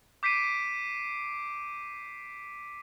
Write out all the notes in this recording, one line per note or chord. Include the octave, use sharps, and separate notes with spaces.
D6 G6 B6 C7 D7 D#7